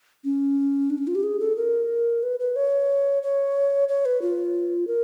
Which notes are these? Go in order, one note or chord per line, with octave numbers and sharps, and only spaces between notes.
C#4
D4
C#4
F4
G4
G#4
A4
A#4
B4
B4
C#5
C#5
C#5
B4
F4
A#4